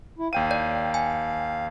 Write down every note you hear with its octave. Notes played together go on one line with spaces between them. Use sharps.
E4
D#2 F5 G5 D#7
D5
G#5